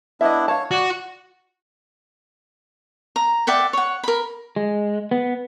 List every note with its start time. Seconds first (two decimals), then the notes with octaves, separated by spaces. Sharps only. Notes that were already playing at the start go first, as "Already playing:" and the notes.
0.21 B3 D4 E4 D#5 E5
0.48 C#5 F5 A5
0.71 F#4 D5
3.16 A#5
3.47 D5 E5 F#5 G5
3.73 C#5 F#5
4.03 A#4 B5
4.56 G#3
5.11 B3